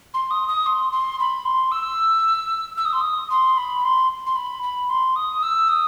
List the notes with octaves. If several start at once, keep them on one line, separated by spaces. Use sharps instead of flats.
C6
D#6
D#6
C6
C6
B5
C6
E6
E6
D#6
C6
D#6
C6
B5
C6
C6
B5
B5
C6
D#6
E6
D#6